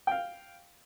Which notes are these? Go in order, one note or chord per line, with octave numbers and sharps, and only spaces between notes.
F5 G5